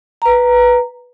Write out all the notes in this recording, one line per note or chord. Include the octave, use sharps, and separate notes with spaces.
B4 A#5